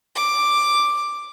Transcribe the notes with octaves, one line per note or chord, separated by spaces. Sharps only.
D6